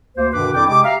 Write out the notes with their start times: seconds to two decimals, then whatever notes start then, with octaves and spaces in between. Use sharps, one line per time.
0.17 D2 A#3 C5
0.33 G2 B2 D3 D#3 B4 D6
0.54 F2 D4 E4 D5 G5 D6
0.67 C3 G#3 G#4 G5 D6
0.85 G4 E5 F5 A#5